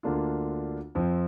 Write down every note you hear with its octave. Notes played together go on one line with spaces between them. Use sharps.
D2 D3 A#3 D4 F4
F2 F3 C4